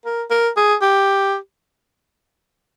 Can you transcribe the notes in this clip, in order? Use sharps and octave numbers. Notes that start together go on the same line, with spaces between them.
A#4
A#4
G#4
G4